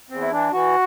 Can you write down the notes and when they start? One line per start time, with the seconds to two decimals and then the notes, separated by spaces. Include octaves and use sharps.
0.10 E2 C4
0.21 E4
0.32 E3 D4
0.53 E3 F#4